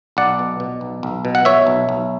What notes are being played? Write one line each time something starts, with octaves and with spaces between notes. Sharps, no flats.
B1 D5 F#5
B2
B2
B1
B1
B2
F#5
B2 C#5 E5
B1
B1